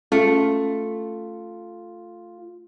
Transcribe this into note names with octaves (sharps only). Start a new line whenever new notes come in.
A3 C#4 F4